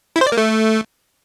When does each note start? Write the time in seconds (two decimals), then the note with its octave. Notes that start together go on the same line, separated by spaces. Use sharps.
0.16 E4
0.21 C5
0.27 D5
0.32 A#3
0.37 A3